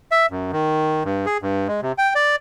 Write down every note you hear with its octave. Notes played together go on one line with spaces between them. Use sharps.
E5
F#2
D#3
G2
G#4
G2
G#3
C3
G5
D5